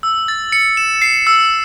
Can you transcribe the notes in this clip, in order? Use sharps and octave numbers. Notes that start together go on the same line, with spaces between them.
E6
A6
C#7
E7
C7
E6